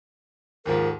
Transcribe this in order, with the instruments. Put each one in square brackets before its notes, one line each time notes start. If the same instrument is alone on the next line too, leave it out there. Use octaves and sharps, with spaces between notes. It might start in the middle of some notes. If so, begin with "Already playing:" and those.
[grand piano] D#2 G#2 F3 [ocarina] A#4